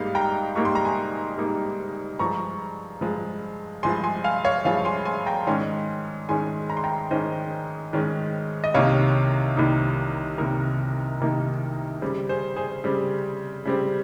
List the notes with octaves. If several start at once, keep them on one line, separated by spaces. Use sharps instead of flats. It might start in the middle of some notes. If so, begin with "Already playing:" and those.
Already playing: G#2 G3 A#3 D#4 F5
G5 A#5
G#2 G3 A#3 D#4 C#6
C6
A#5
G#5 C6
G#2 G3 A#3 D#4
G2 F3 G#3 A#5 C#6
G2 F3 G#3
G2 F3 G#3 G#5 C6
G#5 C6
F5 G#5
C#5 F5
G2 F3 G#3 F5 G#5
G#5 C6
G#5 C6
G5 A#5
G#2 D#3 G#3 C#4 G#5 C6
G#2 D#3 G#3 C#4 G#5 C6
A#5
C6
G5 A#5
G#2 D#3 G#3 C#4 C5 D#5
G#2 D#3 G#3 C#4
D#5
C2 C3 D#3 A#3 D#4 C#5 F5
C2 C3 D#3 A#3 D#4
C2 C3 D#3 A#3 D#4 A#4
C2 C3 D#3 A#3 D#4
C#3 G3 C4
G#4 C5
G#4 C5
C#3 G3 C4
C#3 G3 C4